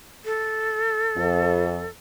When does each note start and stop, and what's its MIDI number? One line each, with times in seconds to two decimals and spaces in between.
0.25 1.89 69
1.17 1.86 41